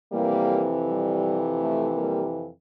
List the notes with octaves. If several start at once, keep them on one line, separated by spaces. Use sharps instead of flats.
F2 C3 E3 G3 A#3
G3
A3
G3 A#3